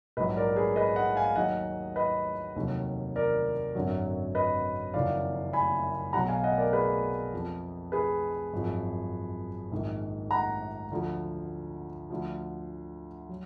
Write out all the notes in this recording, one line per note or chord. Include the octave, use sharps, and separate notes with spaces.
A#1 G#2 F#3 B4 D#5
A#4 D5
G#4 B4
B4 D#5
D#5 F#5
F5 G#5
D#2 D#3 F#3 D#5 F#5
B4 D#5
F1 D#2 D#3 F#3
A#4 D5
G#1 F#2 D3 F#3
B4 D#5
F#1 F2 D#3 F#3 D5 F5
G#5 B5
B1 B2 F#3 F#5 A#5
F5 G#5
D#5 F#5
A#4 D5
G#4 B4
F2 F3
G#4 B4
G#1 F#2 F3
A#1 G#2 D#3
F#5 A#5
D2 D3 F3
D2 D3 F3
F#3